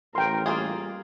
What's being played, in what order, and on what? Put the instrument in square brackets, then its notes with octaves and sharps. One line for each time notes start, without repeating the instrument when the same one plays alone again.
[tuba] A1 [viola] A#4 [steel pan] G5 C6
[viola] G3 [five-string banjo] A#3 F4 G#4